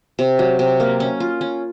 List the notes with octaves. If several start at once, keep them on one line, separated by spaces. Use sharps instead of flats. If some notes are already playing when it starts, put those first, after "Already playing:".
C3
F#3
C3
A#3
C#4
F4
C#4